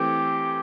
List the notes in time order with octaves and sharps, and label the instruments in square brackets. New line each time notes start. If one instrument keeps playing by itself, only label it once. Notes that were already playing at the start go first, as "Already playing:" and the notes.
Already playing: [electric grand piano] E3 A3 C4 A4 [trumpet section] G4